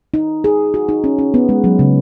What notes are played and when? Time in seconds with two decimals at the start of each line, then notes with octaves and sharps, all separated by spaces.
0.14 D#4
0.44 G#4
0.74 F#4
0.89 D#4
1.04 C#4
1.19 C#4
1.34 B3
1.49 G#3
1.64 F#3
1.79 C#3